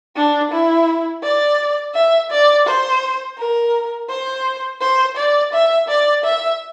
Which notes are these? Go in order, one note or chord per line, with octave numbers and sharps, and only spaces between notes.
D4
E4
D5
E5
D5
C5
A#4
C5
C5
D5
E5
D5
E5